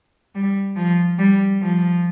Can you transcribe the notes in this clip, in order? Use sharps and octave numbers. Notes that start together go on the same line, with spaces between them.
G3
F3
G3
F3